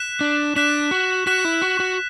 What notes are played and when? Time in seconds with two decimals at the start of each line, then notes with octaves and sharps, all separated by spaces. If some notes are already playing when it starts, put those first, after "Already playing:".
Already playing: F#6 B6 E7
0.21 D4
0.56 D4 F#6 B6 E7
0.91 F#4
1.27 F#4 F#6 B6 E7
1.45 E4
1.62 F#4
1.80 F#4